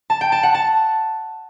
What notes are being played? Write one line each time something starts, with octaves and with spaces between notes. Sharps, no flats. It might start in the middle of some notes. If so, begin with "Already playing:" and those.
A5
G5
A5
F#5
A5